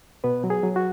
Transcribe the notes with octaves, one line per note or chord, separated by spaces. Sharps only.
B2 B3 B4
F#3
G#4
F#3
F#4